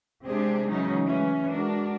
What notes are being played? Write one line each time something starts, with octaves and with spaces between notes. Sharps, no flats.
C3 G#3 C4 D4 G4 G#4
C#3 E3 F#3 G#3 C#4 D#4
E3 G#3 A3 C#4
G#3 D4 F#4 A#4